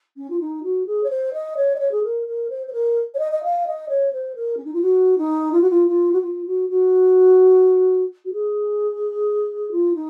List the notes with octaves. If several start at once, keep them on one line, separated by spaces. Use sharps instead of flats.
C#4
F4
D#4
F#4
G#4
C#5
C5
D#5
C#5
D#5
C#5
G#4
A#4
A#4
C5
C5
A#4
C#5
D#5
D#5
F5
D#5
C#5
C5
A#4
C#4
D#4
F4
F#4
D#4
F4
F#4
F4
F4
F#4
F4
F#4
F#4
F#4
G#4
F4
D#4